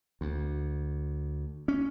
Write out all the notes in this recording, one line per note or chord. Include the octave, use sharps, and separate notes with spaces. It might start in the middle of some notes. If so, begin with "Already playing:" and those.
D2
C#4